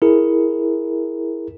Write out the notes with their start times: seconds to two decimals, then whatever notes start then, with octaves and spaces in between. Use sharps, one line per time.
0.02 E4 G#4 A#4